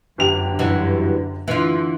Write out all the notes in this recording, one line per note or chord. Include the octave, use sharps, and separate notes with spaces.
G1 F#2 D3 G4 F7
G2 E3 F#3
D3 E3 F4